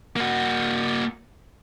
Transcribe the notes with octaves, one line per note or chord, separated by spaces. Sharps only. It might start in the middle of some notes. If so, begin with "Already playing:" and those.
A#3 F#4